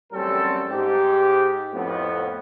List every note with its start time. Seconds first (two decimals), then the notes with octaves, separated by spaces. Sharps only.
0.13 A1 F#2 G3 C4 C#4 A4
0.69 G#2 G4
1.74 F2 A2 B3